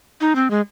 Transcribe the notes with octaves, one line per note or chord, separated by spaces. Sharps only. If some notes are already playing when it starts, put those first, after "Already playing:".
D#4
C4
G#3